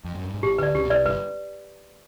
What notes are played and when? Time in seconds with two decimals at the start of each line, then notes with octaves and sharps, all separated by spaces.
0.04 F2
0.15 F#2
0.25 G2
0.34 G#2
0.43 A1 A2 G4
0.58 D2 D3 B4 D5
0.75 C#2 C#3 G4
0.84 B2
0.90 C2 C3 B4 D5
1.06 G1 G2 B4